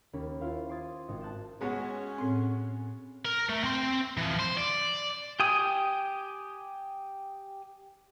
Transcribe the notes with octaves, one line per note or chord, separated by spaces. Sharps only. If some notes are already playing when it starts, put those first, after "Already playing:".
D#2 A#3 C#4 B5
E4 F4 B4 C5 F5
C6 D6 D#6 G#6 A6 D#7
G#1 D#5
A5 F#6 G6 A6 E7
G#3 B3 C#4 F#4
A2 C4
A#4
A3
C4 C6
E3 F3
C5
D5
G4 G5 G#5 D#6